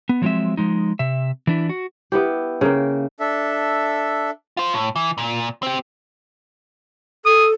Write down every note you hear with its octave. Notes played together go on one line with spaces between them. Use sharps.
B3
F3 F#3 G#3 B3 C4 E5
F3 G#3 D#4
C3 E5
E3 D4 E4
F#4
B3 E4 G4
C#3 A#3 G5
D4 A4 E5
F4 C5
A2
E3
A#2
C4 G4
A4 D#6